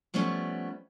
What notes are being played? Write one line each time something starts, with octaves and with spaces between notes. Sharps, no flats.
F3 G3 A3 B3 C#4